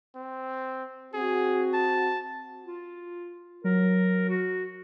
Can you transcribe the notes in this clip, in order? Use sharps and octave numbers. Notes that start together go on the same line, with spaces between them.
C4
C4 F#4 G#4
A5
F4
F#3 A#4
F#4